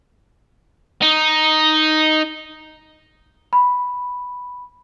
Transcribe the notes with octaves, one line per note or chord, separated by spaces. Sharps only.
D#4
B5